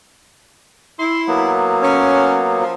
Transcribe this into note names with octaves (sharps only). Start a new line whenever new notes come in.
E4 C6
F#3 A#3 B3
C#4
F3